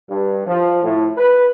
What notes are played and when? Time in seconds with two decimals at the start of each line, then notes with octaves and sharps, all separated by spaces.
0.11 G2
0.47 F3
0.83 A2
1.18 B4